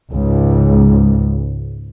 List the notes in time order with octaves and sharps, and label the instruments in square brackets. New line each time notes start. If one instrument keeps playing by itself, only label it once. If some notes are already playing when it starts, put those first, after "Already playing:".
[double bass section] C#2 G#2